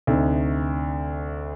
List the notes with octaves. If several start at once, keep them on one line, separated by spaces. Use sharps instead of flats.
D2 C3 D#4